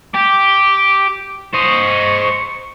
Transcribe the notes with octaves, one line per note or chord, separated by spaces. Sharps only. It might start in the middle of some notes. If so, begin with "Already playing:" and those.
G4 D6
C5 D#5 C#6